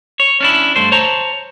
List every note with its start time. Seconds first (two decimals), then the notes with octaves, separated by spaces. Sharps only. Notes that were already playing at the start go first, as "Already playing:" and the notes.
0.20 C#5
0.41 C#4 D4 E4
0.76 G2 A3 C5
0.92 C5 C#5 A5 A#5